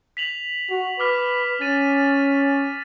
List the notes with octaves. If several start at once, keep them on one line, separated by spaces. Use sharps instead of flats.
B6 F7 F#7
F#4
B4 D6 F6 B6
C#4 A6 D#7